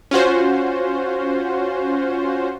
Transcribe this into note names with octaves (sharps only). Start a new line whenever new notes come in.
C#4 F4 F#4 C5